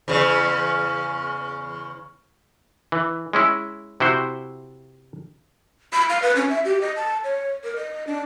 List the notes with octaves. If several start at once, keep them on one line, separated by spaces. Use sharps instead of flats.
E2 C#3
E3
G#3 C#4 E4
C3 E4 F#4 C5
B5
F5
B4
C#4
E5
G4
D#5
A5
C#5
A#4
D#5
D4